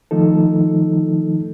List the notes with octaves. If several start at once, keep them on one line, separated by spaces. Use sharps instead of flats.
D#3 F3 A3 D#4 A4